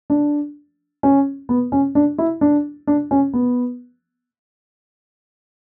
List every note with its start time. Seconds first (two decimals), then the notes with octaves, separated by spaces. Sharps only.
0.10 D4
1.03 C#4
1.49 B3
1.72 C#4
1.95 D4
2.18 E4
2.41 D4
2.87 D4
3.11 C#4
3.33 B3